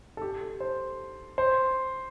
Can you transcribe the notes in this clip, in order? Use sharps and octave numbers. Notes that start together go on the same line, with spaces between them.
A4
G4
A4
C5
C5